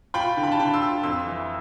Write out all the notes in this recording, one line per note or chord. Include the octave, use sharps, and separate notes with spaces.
F4 G5 B5
D3
B5
A5
D3 G5 B5
C6 E6
F4
F2 C6 E6
E3